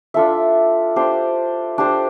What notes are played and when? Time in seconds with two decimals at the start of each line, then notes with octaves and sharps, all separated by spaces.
0.14 D4 F4 A4 E5
0.96 D4 G4 C5
1.78 D4 G4 C5